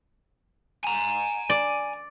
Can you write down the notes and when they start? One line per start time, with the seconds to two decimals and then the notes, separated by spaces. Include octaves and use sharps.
0.84 G#5 A#5
1.50 D5